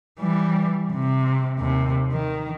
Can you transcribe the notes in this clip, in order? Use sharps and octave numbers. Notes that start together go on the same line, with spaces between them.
E3 G3
C3
D#2 C3
D#3